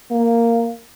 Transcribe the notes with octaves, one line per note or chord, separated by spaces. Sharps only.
A#3